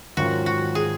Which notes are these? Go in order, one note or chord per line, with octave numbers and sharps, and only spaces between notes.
G#2 D#3 F#3 C#4 F4 F#4
F#4
G#4